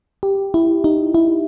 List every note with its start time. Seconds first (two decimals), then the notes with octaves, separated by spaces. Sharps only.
0.23 G4
0.54 E4
0.84 D#4
1.14 E4